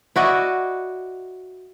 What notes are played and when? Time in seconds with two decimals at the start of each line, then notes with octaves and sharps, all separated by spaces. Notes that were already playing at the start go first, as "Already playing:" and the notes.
0.16 E4 F#4 D5 D#5